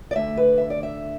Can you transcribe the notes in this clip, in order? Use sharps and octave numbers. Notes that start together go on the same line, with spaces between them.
D5
D2 D3 A3 E5
B4
E5
D5
E5